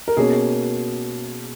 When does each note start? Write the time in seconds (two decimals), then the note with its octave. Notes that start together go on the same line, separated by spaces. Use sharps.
0.08 A#4
0.17 B2 A#3 C#4 G#4